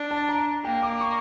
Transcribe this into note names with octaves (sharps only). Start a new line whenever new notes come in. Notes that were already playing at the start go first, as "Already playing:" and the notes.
Already playing: D4
A5
A#5
A#3 G5
D6
C#6